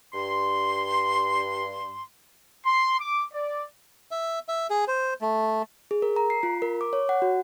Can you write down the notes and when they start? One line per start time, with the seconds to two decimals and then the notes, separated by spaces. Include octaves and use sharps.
0.14 G2 C6
2.64 C6
2.99 D6
3.32 D5
4.11 E5
4.48 E5
4.70 G#4
4.88 C5
5.21 A3
5.91 G#4
6.02 A#4
6.16 A#5
6.30 C7
6.43 F4
6.62 A#4
6.81 D6
6.93 C#5
7.09 F#5
7.22 F#4